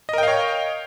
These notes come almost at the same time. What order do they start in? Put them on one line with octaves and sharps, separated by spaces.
D#5 A#4 G5 F5 C#5